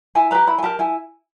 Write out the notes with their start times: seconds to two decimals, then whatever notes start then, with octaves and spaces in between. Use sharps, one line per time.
0.15 E4 G#5
0.31 G4 B4 A#5
0.47 E4 B5
0.58 G#5
0.63 G4 A#4 A5
0.79 E4 G#5